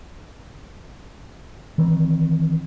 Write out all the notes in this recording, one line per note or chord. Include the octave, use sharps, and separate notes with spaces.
D#3 E3 C4